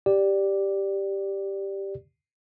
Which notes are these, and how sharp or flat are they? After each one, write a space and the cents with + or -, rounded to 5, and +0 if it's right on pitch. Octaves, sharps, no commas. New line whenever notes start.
G4 +0 D5 +0